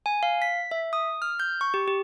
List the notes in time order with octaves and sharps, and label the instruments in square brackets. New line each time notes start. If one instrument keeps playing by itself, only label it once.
[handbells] G#5
F5
B6
E5
D#6
F6
G6
C#6
G4
G4